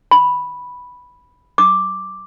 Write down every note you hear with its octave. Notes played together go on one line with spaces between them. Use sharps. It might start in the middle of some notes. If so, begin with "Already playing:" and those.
B5
D6